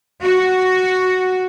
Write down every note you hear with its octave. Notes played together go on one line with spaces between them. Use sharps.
F#4